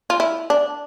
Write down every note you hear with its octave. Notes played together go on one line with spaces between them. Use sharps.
F4
E4
D4